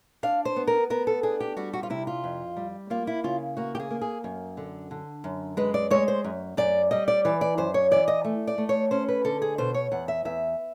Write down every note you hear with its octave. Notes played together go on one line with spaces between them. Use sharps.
D4 F5
C5
B3
A#4
B3 A#4
A4
D4 G#4
G4
G3 F#4
F#4
F4
C3 E4
F4
F2
G3
A#3 F4
E4
C#3 F4
A#3 F#4
G4
G#4
A#3
G#4
F#2
D3
D3
F#2
G#3 B4
D5
G#3 C#5
C5
F#2
F#2 D5
G3 D#5
D5
E3 D5
D5
F#2 C5
C#5
E3 D5
D#5
A3
D5
A3
C#5
C#4 C5
B4
D3 A4
G#4
B2 C5
C#5
E2 F#5
E5
E2 E5